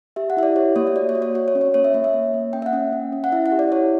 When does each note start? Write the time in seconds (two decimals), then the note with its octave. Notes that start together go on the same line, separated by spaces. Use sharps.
0.16 G4 E5
0.30 F#5
0.37 E4 E5
0.43 D5
0.56 G4 C#5
0.76 A#3 C#5
0.87 E5
0.96 F#4 D5
1.09 C#5
1.15 F#4
1.22 C#5
1.35 F#4 C#5
1.48 C#5
1.55 C#4
1.61 C#5
1.74 A#3 C#5
1.84 E5
1.94 A#3 C#5
2.04 E5
2.14 A#3
2.34 A#3
2.53 C#4 G5
2.62 E5
2.66 F#5
2.73 C#4
2.93 C#4
3.12 C#4
3.24 F#5
3.32 E4 E5
3.46 F#5
3.52 G4
3.59 D5
3.72 E4 C#5